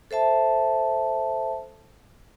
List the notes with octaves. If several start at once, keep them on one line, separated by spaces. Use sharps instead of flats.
A4 C5 E5 A5